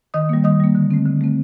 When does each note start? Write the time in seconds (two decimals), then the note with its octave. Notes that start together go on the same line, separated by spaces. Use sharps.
0.14 D#3 D#5 D#6
0.29 G3 A#3
0.44 D#3 D#5 D#6
0.60 G3 A#3
0.75 D3
0.91 A3 C4
1.06 D3
1.21 A3 C4